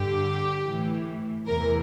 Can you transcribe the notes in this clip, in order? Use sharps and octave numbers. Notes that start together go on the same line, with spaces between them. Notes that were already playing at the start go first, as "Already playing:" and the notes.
Already playing: G2 D3 G4
A2 E3
E2 C3 E3 A#4